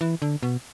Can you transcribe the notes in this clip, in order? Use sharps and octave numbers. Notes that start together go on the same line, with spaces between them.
E3
D3
B2